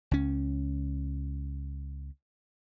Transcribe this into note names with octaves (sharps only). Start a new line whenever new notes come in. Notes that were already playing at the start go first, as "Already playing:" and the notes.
C#2 C#4